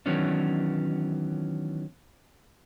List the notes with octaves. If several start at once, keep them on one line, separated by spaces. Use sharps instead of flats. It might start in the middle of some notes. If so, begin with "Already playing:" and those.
D#3 E3 F#3 B3 C#4 D4